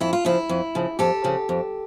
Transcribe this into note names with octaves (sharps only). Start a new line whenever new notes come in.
F2 E4
F4
C#3 F3 E4
F2
C#3 F3
F2 G4 A4
C#3 F3
F2